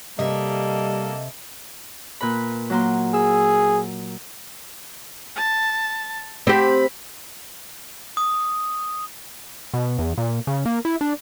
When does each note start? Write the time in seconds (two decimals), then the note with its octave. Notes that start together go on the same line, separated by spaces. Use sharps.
0.19 C3 G3 A#3 A4 D#5 E5
2.21 A#2 B4 B5
2.70 F#3 A#3 C6
3.14 G#4 E6
5.36 A5
6.47 C4 G4 B5
8.17 D#6
9.74 B2
9.98 E2
10.18 A#2
10.47 C#3
10.66 A#3
10.85 E4
11.01 D4